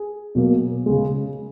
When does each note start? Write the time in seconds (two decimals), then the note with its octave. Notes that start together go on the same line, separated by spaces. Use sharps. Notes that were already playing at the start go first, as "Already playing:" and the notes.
Already playing: G#4
0.35 B2 F#3 A#3
0.86 C#3 G#3